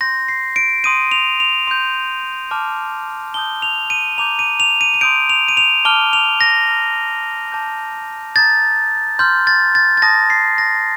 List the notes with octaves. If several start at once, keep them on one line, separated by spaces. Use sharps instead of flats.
C6 G6 A#6
C7
D7
C6 D#6 G6 D#7
F7
F7
C6 G6
A5 D6 F6
A5 D#6 G6 G7
F7
D#7
A#5 D6 G6 F7
D#7
F7
D#7
D#7
C6 D#6 G6 D7
F7
D#7
F7
A5 D6 F6 G7
F7
A#6
A#5 F6
A5 D6 G6
A#5 D#6 G6 A6
C6 F6 G6
A6
A6
A6
A5 D#6 G6 A#6
C7
A#6